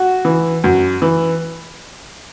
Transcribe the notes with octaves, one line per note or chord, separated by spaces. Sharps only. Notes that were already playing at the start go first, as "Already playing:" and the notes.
Already playing: F#4
E3
F#2
E3